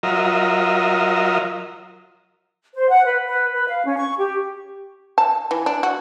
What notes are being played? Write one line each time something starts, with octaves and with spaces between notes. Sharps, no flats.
F#3 F4 A#4 D#5 E5
C5
F#5
B4
B4
B4
F5
C#4
C#6
G4
A5
E3
D4
F#4